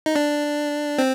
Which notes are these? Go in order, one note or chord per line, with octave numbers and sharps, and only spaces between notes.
D#4
D4
C4